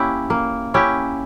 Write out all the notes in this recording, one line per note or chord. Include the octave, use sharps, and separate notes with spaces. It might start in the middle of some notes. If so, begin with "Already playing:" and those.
Already playing: A#3 C#4 E4 G4
A#3
C#4 E4 G4